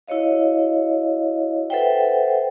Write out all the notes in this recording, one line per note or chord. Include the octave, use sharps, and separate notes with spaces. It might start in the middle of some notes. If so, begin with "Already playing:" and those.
E4 F#4 C#5 D#5 F5
A4 B4 C5 E5 F#5 G5